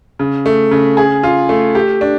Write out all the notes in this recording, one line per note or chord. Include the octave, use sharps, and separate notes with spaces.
C#3
A3
C#3
G#4
F4
A3
G4
D4